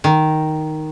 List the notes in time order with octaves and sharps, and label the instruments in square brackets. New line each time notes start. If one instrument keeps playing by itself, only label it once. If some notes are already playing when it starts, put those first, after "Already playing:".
[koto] D#3